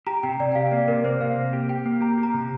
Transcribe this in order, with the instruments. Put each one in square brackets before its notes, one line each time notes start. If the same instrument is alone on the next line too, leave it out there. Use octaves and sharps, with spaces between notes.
[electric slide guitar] G4 [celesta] A#5
[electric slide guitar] C3 [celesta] G5
[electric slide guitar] C3 [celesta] D5
[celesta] G5
[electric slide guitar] G4 [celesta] F5
[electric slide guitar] A#3 [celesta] D5
[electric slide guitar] C3 [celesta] A#4
[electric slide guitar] A#3 [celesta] C5
[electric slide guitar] C3 [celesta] F5
[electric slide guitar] A#3
G4
[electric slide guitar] G4 [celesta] G5
[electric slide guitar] A#3
[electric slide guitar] G4 [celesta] A#5
[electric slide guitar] G4
[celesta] A#5
[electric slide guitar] C3